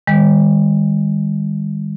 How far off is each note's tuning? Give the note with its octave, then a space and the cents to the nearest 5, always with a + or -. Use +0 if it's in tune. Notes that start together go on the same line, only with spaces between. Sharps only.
D#3 +0 G3 +45